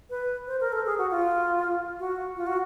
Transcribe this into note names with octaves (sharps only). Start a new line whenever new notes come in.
B4
C5
A#4
A4
G#4
F#4
F4
F#4
F4
F#4